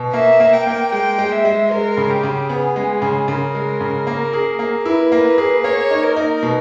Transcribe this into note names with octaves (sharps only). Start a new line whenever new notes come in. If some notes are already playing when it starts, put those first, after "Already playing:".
Already playing: B2
A#3 E5
A#3
G5
A#3
G#3 G5
G#3
E5
G#3
G#3 A#4
C#3
G4
C#3
B3 G#4
G#3
C#3
C#3 A#4
G#3
C#3
A#3
G#4
A#3
E4 B4
A#3
G#4
A#3 C#5
D#4
A#4
D#4
B2